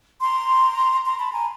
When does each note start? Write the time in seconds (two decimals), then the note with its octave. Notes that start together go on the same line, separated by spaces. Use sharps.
0.21 A#5 C6
1.05 A#5 C6
1.18 A5 B5
1.33 G#5 A#5